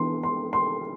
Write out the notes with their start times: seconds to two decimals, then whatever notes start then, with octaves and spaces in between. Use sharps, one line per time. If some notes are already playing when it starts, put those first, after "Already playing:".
Already playing: E3 B3 D4 C6
0.23 C6
0.53 C6